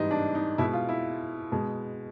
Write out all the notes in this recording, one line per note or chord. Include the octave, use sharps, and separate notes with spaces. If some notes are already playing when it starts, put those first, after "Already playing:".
Already playing: G#2 E3 G3 D#4
D4
D#4
B2 G#3 E4
F4
E4
B2 G#3